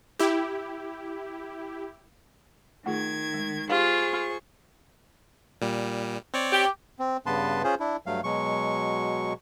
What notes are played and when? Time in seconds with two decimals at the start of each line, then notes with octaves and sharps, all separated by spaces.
0.19 E4 G4
2.86 D#3 A3 F4 G#4 G#6
3.34 G#3
3.69 F4 G4 G#4 C5 F5 C#6
5.62 A#2 G3
6.34 C4 C#5 D5
6.52 G4
6.99 C4
7.26 G2 C#3 B3 B4 A5 C6
7.64 C#4 F4 G#4 C5
7.80 D4 E4
8.06 G2 F#3 A3 F5
8.24 B2 F#3 G#3 C#6